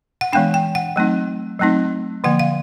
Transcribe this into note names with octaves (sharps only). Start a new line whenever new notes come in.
F#5
E3 G#3 B3 D4 G5
G5
F#5
F#3 A3 C4 D#4
F#3 A3 C4 D#4
D3 F3 A#3 F#5
F5